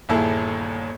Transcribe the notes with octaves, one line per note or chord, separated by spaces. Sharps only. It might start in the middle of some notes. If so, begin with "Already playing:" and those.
G1 D#2 A#2 E4 G#4 A4